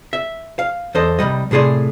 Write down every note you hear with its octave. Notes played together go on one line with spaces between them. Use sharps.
E5
F5
E2 A4 C5 D#5
C2 C#3 G3 D#5
A2 C3 G#4 D5 C6